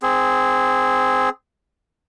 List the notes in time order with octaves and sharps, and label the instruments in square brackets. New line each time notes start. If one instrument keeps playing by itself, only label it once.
[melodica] C4 G#4